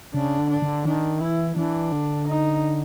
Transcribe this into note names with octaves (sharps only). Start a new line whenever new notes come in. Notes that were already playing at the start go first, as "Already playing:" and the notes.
C#3 D4
D3
D4
D3
D#3 D4
E3 E4
E3 D4
D3
D#4